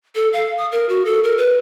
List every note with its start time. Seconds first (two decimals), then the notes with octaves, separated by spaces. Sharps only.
0.15 A4
0.33 F5
0.58 D#6
0.72 A#4
0.89 F#4
1.05 A4
1.24 A#4
1.38 B4